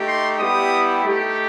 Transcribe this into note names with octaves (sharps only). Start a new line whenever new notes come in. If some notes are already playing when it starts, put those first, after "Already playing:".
Already playing: A3 D#4 G4
C6
G3 B3 E4 G4 D#6
A3 D#4 G4